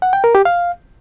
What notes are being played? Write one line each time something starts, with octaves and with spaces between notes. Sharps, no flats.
F#5
G5
A#4
G4
F5